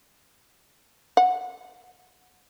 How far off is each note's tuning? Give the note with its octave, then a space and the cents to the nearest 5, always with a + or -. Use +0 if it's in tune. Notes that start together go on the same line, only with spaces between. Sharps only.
F#5 -10